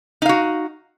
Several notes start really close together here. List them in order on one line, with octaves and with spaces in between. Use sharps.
D#4 F5 F#4